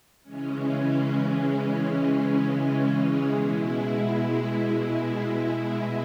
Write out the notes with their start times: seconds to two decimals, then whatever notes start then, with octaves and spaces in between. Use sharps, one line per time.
0.23 C#3 E3 G#3 C#4
3.31 B2 G#3 E4